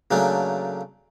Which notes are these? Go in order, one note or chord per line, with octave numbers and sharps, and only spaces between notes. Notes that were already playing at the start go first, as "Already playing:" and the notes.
C#3 F#3 A3 A#3 D4